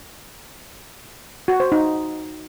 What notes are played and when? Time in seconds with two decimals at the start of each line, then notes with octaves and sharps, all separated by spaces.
1.48 F#4
1.60 C5
1.72 D#4